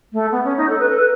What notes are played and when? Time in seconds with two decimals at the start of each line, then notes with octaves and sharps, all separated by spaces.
0.13 A3
0.32 B3
0.45 C#4
0.57 D#4
0.69 A4
0.80 B4
0.89 A4
0.99 B4